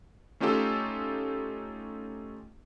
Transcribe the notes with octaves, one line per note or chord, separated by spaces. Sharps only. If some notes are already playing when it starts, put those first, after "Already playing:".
A3 C#4 D#4 F4 G4 A4